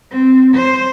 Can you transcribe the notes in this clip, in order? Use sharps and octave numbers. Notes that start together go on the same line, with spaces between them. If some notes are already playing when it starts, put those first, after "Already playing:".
C4
C5